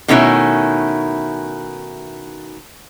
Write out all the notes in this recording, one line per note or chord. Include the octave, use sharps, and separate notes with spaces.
B2 D#3 A3 C#4 D#4 E4